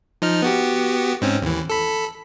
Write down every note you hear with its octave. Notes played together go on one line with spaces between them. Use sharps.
F3 D#4 F6
B3 F#4 G4
G#2 C4 C#4
D#2 E3
A4 B5